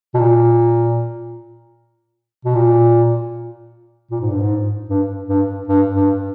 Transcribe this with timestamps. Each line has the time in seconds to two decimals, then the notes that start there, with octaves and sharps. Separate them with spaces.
0.14 B2
0.19 A#2
2.45 B2
2.55 A#2
4.11 A#2
4.21 G#2
4.31 G2
4.40 G#2
4.89 G2
5.28 G2
5.68 G2
5.94 G2